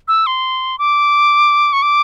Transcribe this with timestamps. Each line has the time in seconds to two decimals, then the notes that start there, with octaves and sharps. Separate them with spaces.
0.08 E6
0.27 C6
0.79 D6
1.73 C#6
1.82 D6